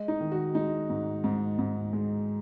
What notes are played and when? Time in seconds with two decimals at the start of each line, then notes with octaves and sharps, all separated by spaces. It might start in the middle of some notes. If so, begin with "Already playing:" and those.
Already playing: G#3 D#5
0.08 D#4
0.20 D#3
0.32 F#4
0.54 G#3 D#4
0.90 G#2
1.24 G#2
1.59 G#2
1.93 G#3